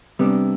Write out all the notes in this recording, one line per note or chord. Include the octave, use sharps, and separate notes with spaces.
C3 G3 B3 D4